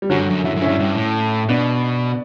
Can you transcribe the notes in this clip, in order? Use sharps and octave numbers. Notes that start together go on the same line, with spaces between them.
G3
F#2 D3 F#3
G2
F#2
F#2 E4
F#2
C#4 E4
G2
G2
A2
B2 B3 D4